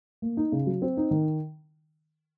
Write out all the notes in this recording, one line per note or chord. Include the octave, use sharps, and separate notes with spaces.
A#3
D#4
C#3
F#3
C4
D#4
D#3